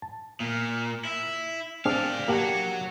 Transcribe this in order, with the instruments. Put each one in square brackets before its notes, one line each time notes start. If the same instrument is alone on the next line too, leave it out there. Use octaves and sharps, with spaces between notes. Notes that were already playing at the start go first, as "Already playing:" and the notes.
[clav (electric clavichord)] A5
[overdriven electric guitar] A#2
E4
[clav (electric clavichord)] C4 D4 G#4 [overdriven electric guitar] D5 F5
[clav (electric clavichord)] A#3 G4 A5 [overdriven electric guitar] F#4 C#5